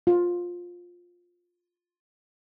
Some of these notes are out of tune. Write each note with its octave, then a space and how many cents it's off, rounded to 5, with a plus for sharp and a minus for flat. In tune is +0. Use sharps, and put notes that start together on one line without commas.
F4 +10